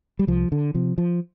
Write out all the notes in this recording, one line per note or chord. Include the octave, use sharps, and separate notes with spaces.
G3
C2 F3
D3
C3 F3
F3